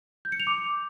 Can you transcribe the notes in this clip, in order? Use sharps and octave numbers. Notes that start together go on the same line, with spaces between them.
G6
C#7
F7
D6